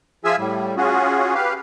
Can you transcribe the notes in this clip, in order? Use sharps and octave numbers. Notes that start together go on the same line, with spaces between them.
F3 F4 G#4 E5 G#5 E6
A2 G3
C#4 F4 F#4 G#4
G4 B4 F5